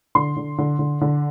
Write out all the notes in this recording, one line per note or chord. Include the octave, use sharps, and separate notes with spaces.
D3 C6
D3
D3
D3
D3